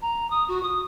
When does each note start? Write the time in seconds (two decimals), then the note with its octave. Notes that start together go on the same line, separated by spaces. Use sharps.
0.02 A#5
0.30 D#6
0.48 F#4
0.63 D#6